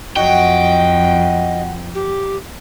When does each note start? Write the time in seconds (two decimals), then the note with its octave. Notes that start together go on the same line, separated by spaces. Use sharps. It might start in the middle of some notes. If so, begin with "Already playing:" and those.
0.16 F2 F#3 F#4 D#5 G5
1.95 G4